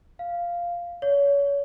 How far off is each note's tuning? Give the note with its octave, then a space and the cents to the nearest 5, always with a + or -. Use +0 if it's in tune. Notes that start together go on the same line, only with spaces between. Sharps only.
F5 -5
C#5 +30